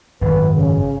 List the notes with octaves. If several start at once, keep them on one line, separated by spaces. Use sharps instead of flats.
G#1 F#2 B4
C#3